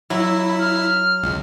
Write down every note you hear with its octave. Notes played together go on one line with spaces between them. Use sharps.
F#3 E4 E6
B5
F6
C#2